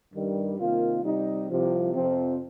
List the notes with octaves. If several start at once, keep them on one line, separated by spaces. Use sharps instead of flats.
G2 D#3 G3
C3 D#3 A#3 F4
C3 G3 D#4
C2 C3 F3
F2 C3 F3 C4